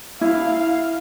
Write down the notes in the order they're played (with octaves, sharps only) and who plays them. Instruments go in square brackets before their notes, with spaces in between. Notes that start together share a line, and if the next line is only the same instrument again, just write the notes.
[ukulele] E4 [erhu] F5